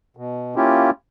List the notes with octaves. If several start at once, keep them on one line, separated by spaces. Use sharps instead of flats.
B2
A#3 C#4 E4 F4 G4